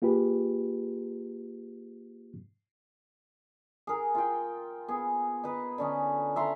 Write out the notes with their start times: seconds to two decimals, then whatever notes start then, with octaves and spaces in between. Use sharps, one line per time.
0.02 A#3 F4 G4 G#4 B4
3.87 G#4 A#4
4.15 F4 G5
4.88 B3 G#4
5.44 D#4 B4
5.78 D3 C#4 D#4
6.35 A4 E5 A#5 C6